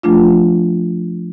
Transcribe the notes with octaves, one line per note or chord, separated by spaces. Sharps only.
F3 A3 D4 F4